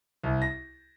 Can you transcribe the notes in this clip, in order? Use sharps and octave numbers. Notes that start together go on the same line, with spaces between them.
C2
A#6